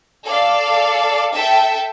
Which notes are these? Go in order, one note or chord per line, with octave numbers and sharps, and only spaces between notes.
A4 D5 F5
A4 E5 G5 A5